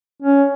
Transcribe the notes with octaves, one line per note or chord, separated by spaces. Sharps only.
C#4